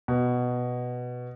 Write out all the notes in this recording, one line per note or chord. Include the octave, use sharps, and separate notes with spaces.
B2